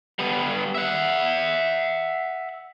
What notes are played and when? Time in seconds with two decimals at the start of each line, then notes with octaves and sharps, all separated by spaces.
0.19 G3 B3
0.75 E5 F#5